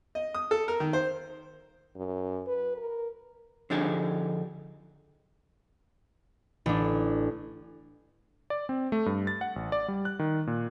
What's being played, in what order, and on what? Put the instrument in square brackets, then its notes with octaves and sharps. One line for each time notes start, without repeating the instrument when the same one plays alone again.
[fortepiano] D#5
D#6
A4
A#4
D#3
C5
[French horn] F#2
B4
A#4
[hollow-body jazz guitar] D3 F3 D4 D#4 G4 G#4
[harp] A1 D4
[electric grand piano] D5
C4
A3
G2
A6
F#5
A1
D5
G3
F#6
D#3
A#2